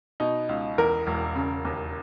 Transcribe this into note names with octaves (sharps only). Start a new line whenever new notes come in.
B2 D#4
C#2
E2 A#4
E1
C#3
D#2